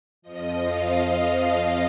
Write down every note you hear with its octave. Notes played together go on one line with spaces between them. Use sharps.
F2 F3 D#5
F5
D#5
D#5